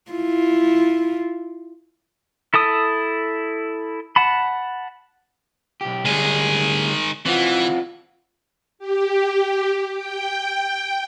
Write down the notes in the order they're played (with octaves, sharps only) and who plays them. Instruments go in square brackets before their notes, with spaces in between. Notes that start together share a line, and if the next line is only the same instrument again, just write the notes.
[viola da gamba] E4 F4
[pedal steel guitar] E4 A4 A5 D#6
F#5 A5 B5
[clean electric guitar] B1 G4
[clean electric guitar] D2 G3 G#3 [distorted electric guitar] D#3 G#4
[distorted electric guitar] E3 [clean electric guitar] C4 F4 F#4
[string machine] G4
G5